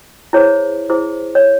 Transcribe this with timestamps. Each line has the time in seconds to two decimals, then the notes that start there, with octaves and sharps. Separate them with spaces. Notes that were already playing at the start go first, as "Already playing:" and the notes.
0.33 E4 G#4 C5 C#5
0.90 E4 G#4 C5
1.35 C#5